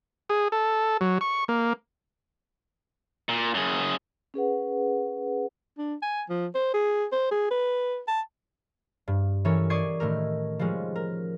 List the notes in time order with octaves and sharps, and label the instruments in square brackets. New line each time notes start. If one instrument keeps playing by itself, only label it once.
[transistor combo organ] G#4
A4
F#3
C#6
A#3
[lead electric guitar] A#2
F#2 G#4
[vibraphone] C#4 G#4 B4 F#5
[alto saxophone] D4
G#5
F3
C5
G#4
C5
G#4
B4
A5
[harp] G2
E3 C#4 A4 A#4 C#5
D5 C#6 D#6 G#6 C7
A2 D#3 A3 A#4
F3 G3 G#3 C#4
A#4